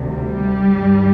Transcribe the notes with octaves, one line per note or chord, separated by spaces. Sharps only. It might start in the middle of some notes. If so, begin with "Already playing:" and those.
Already playing: D2 C3 D#3
G3
G2
D#3